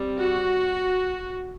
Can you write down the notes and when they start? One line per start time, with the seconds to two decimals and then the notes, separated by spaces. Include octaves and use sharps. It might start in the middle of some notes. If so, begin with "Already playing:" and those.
Already playing: G3 C4
0.18 F#4